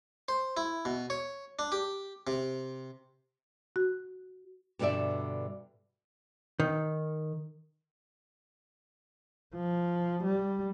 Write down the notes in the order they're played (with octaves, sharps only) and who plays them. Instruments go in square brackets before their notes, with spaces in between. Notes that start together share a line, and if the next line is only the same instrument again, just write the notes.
[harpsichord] C5
E4
B2
C#5
D4
G4
C3
[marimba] F#4
[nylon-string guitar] G2 B2 D3 G3 D5 E5
[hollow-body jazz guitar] D#3
[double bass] F3
G3